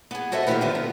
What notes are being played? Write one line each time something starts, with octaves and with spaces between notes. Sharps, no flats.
B3 G#4
F#4 A4 C5 D#5 E5 F#5
D3 E3 A#3 D#4 G4 B4
D3 D#3 D#4 F4 A4 C5
B3